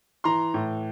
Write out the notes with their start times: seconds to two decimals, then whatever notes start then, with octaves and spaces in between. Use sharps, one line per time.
0.24 E3 A#5 C6
0.54 A2